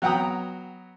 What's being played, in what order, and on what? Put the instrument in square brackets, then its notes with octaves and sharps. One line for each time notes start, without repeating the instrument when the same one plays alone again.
[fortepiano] F#3 B3 F#5 G5 A#5 D#6